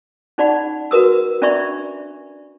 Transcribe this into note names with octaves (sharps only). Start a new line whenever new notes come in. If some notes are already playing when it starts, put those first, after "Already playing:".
C#4 D#4 D5 F#5 B5
F#4 A#4 B4 D#6 E6
C#4 D4 D5 E5 B5 C#6